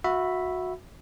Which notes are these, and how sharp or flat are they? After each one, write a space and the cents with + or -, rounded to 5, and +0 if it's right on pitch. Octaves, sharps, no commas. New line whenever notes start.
F#4 -20 E5 +0 B5 +0